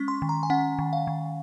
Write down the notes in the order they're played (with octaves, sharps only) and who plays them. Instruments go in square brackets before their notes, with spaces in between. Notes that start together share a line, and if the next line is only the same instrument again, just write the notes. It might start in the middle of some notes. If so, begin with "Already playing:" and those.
Already playing: [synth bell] G#3 C#4 C#6
C6
D#3
A#5
G#5
C#4 F#5
D#3
F5
D#3